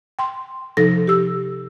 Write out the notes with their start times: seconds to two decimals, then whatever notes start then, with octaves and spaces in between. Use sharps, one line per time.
0.19 G5 C6
0.77 C3 F3 D#4 A4 A#6
1.07 G4 E6